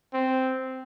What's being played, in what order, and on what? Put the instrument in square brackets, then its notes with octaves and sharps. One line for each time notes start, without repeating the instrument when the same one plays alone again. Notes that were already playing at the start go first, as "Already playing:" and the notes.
[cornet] C4